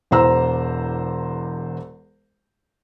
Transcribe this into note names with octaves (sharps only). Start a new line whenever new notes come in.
E1 E2 C5 A#5 E6